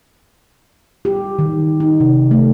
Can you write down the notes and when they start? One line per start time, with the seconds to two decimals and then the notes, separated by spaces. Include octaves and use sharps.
1.05 G4
1.39 D#3
1.80 D#4
2.00 C3
2.31 A3